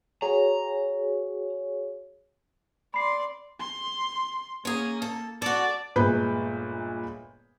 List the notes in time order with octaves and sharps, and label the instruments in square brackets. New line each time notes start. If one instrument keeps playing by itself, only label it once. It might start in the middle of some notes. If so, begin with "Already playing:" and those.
[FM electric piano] F#4 G#4 C#5 [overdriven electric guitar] A#5
[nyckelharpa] D5 C6 [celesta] B5 C7
[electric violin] C6
[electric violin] A#3 [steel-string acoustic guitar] C#4 G#4
[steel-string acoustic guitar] A4
[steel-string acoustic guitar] F#4 A4 [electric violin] D5
[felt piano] G1 A#2 G#3 B4 B5 G6